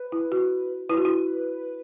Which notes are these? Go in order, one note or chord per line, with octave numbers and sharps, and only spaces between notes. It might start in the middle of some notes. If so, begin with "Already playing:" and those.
Already playing: B4
E4
F#4
E4 B4
F#4
E4